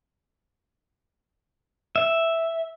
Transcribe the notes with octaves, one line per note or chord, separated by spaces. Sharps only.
E5